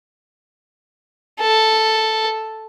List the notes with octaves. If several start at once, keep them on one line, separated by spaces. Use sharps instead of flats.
A4